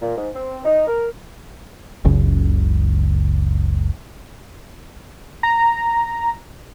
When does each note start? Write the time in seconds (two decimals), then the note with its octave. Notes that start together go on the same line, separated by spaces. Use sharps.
0.01 A#2
0.17 G#2
0.34 C4
0.64 D#4
0.87 A#4
2.05 F#1 C#2
5.43 A#5